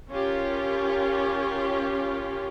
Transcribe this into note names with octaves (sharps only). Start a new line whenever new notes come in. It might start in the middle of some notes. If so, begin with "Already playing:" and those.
C#4 F4 G4 A#4